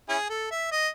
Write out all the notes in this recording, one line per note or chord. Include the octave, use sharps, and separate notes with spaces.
C#4 E4 G#4
A4
E5
D#5